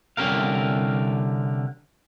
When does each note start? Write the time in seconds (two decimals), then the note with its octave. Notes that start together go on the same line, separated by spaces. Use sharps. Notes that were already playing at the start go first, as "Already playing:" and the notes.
0.17 C2 D3 C#4 G4 A#4 F5